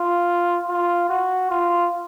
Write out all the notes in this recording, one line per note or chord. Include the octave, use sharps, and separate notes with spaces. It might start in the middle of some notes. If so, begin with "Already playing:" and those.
Already playing: F4
F4
F#4
F4